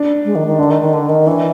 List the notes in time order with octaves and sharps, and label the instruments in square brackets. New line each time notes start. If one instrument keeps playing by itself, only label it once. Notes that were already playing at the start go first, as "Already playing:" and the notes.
Already playing: [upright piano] D4
[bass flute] G#3
D#3
D#3
[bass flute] D3 [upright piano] D4
[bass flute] D#3
D#3
D3
D#3
[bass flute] E3 [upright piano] D4